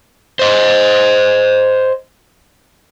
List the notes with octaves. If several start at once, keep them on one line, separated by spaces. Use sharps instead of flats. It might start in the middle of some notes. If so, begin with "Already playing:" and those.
C5 D#5